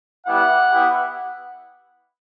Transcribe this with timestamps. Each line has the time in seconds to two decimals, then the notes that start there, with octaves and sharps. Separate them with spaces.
0.26 G3 B3 E4 G4 F#5
0.71 B3 E4 G4